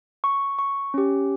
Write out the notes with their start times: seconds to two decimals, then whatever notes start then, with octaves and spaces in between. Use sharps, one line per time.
0.24 C#6
0.59 C#6
0.94 C#4 G4